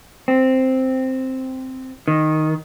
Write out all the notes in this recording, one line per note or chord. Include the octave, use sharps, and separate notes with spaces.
C4
D#3